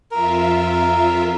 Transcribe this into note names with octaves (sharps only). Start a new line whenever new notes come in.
F2 F4 A#4 E5